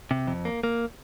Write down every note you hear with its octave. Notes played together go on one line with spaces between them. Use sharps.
C3
F2
A#3
A#3